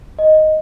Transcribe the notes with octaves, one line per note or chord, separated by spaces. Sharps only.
D#5